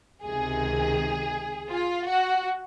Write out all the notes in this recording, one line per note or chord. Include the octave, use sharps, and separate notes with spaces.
C#2 C3 D#3 G#4
F4
F#4